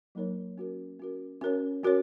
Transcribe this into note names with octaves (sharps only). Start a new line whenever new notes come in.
F#3 A#3 D#4 A#4 C#5
C#4 F#4 A#4
C#4 F#4 A#4
C#4 F#4 A#4 C#5
C#4 F#4 A#4 C#5